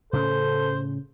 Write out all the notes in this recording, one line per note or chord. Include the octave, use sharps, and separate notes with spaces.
A2 C#3 C#4 A4 C5